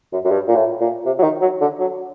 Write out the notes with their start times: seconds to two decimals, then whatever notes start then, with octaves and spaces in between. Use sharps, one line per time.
0.13 F#2
0.25 F#2
0.31 G2
0.48 A#2
0.56 A2
0.81 A#2
1.06 C3
1.19 F#3
1.23 D#3
1.42 F#3
1.61 D3
1.79 F#3